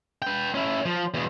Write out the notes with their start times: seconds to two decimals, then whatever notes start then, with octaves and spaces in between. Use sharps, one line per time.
0.22 B4 G5
0.54 C#4 E4
0.86 F3
1.14 E2 B2